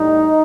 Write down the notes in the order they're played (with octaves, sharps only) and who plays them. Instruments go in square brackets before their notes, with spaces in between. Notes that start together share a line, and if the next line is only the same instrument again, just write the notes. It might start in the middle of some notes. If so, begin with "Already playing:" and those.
Already playing: [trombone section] A2 G3 D#4